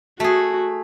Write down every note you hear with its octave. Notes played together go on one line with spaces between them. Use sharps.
A3 F#4 G#4